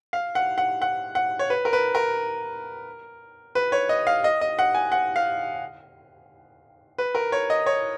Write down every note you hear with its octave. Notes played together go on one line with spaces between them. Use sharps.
F5
F#5
F#5
F#5
F#5
C#5
B4
A#4
B4
A#4
B4
C#5
D#5
F5
D#5
D#5
F#5
G#5
F#5
F5
B4
A#4
C#5
D#5
C#5